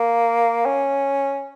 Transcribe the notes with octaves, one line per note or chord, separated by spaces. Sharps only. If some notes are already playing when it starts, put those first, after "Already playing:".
Already playing: A#3
C#4